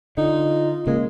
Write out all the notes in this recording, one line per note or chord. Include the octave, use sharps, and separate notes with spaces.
D3 D#4 F4
C#3 G#3 A#3